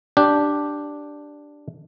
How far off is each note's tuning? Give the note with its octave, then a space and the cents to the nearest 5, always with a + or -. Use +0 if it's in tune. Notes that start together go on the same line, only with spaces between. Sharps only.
D4 +0 G4 +0